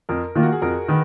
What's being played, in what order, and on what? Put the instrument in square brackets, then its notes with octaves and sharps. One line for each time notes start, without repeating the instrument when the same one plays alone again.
[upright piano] F2 [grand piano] A#4
[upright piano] D#3 A#3 F4
[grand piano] F#4
G#4
[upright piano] F2 [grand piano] A#4
[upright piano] D#3 [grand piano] B4